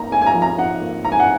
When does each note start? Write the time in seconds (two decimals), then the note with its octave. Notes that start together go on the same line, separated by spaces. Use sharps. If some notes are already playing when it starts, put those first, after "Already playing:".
Already playing: A#3 D#4 A#5
0.11 G#2 G#5
0.22 G#5
0.27 A#5
0.34 F3
0.42 A#5
0.57 D#4 F#5
0.81 A#3
1.04 G#2 A#5
1.12 G#5
1.20 F#5